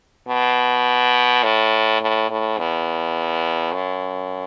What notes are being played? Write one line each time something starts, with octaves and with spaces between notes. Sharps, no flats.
B2
A2
A2
A2
E2
F#2